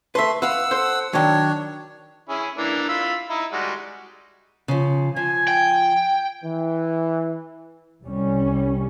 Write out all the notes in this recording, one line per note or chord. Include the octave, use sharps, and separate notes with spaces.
A3 B4 E5 C6
B4 F5 F#5 E6
A4 C5
D#3 F#3 D4 C#5
C#4 E4 G#4
E3 A#3 D4
F4 B5 E6
D#4 E4
G3 G#3 F#4
C#3 F3
F3 G#5
G5
E3
C2 G3 C#4